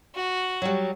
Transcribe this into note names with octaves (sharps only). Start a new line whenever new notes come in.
F#4
F#3 G3